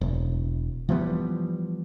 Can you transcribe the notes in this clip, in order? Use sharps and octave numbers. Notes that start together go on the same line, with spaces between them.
E1
E3 F3 G3 B3